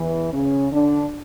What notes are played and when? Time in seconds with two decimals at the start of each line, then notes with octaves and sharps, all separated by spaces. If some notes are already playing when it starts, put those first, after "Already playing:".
Already playing: E2 E3
0.32 C#3 C#4
0.71 D3 D4